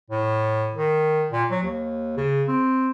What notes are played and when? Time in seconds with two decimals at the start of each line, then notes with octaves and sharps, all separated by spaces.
0.10 A2
0.74 D#3
1.32 A#2
1.51 F#3
1.63 D#2
2.17 C#3
2.48 C4